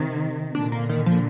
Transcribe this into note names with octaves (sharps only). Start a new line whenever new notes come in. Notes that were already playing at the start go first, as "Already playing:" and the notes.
Already playing: C3 D#3
A#2 D3 D4
A#3
D#3
F3